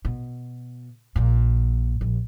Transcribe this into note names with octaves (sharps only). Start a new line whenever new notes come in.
B2
A#1 A#2
A#1